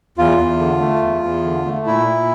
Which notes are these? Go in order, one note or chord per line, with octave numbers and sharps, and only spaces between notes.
E2 F4
E2
D3
A3
E2
E2
D3
A3
A#2 E4
A#2